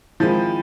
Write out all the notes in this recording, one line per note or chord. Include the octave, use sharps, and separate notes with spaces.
D#3 F3 G#3 C4 E4